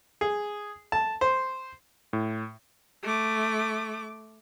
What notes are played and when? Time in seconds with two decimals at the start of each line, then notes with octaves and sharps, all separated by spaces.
0.21 G#4
0.92 A5
1.21 C5
2.13 A2
3.03 A3 D6